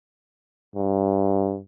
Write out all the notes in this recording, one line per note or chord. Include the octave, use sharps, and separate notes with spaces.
G2